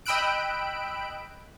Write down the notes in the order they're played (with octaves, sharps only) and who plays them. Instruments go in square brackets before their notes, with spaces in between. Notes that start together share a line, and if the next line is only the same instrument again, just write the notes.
[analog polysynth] D#5 G5 B5 E6 F#6 D7